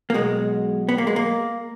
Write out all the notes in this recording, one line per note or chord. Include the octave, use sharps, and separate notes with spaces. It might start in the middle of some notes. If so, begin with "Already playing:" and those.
A#3
B1 B2 G#3
B3
A#3
G#3
A#3